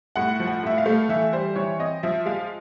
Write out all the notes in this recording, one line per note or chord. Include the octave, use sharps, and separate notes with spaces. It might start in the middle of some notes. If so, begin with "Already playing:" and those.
A2 F#5
F3
F#5
A2 E5
F5
A3
E3 E5
G3 C5
E3 C#5
C4 D#5
F3 E5
G#3 F5